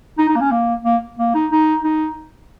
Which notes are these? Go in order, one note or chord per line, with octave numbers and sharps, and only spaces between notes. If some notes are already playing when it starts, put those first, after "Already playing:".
D#4
D#4
A#3
C#4
A#3
A#3
A#3
D#4
D#4
D#4